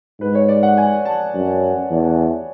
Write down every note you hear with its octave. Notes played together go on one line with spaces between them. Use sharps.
G#2 B4
C#5
D5
F#5
G#5
A5
F#2
E2